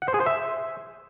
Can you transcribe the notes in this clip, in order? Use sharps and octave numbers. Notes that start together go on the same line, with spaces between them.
F#5
C5
G#4
C5
E5